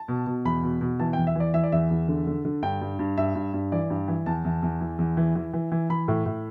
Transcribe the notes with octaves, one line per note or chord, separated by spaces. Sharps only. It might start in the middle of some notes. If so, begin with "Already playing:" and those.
Already playing: A5
B2
B2
E2 B5
B2
B2
E3 A5
E2 G5
E5
E3 D5
E3 E5
D5
E2 E5
E2
D3
D3
D3
G2 G5
G2
G2
G2 E5
G2
G2
E3 D5
G2
E3
E2 A5
E2
E2
E3
E2
E3
E3
E3
E3
E3 B5
A2
A2